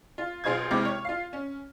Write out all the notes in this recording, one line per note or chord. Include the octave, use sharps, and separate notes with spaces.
F4
B1 F4 G#4 C5 D#5 G#6
D#2 C3 G#3 E4 D6 F6
C#5
F4 F5
C#4